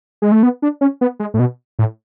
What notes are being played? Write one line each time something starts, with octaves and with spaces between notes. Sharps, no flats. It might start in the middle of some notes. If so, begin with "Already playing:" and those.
G#3
A3
B3
D4
C#4
B3
G#3
A2
B2
A2